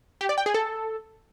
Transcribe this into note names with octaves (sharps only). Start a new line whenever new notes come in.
G4
D5
G5
G#4
A4